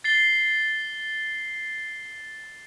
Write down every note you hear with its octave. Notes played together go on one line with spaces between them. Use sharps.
A6 C7 G7